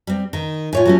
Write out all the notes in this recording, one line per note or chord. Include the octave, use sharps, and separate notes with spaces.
G3 C4
D#3
A2 F4 C#5 G#5
F#3 A3 C#4